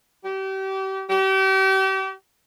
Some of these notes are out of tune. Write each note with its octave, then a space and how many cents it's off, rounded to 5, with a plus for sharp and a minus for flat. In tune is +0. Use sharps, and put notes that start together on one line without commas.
G4 -35
G4 -35